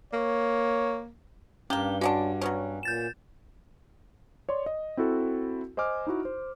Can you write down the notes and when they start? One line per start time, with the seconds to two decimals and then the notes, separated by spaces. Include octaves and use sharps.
0.14 A#3 C#5
1.70 G2 A#3 C#4 G4 G7
2.01 G#3 C#4 D4 F#4 F#5
2.41 F#3 B3 C#4
2.83 A#2 G6 A6 E7
4.49 C#5 D5 C6
4.66 D#5
4.97 C4 E4 F#4 A4
5.77 C5 D#5 G#5 D6 F6
6.07 D#4 E4 F#4
6.25 C5